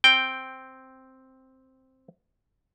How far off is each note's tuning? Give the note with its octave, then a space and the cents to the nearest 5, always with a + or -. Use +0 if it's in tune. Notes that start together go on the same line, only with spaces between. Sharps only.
C4 +0 G5 +0